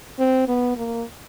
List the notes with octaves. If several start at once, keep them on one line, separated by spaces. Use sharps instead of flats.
C4
B3
A#3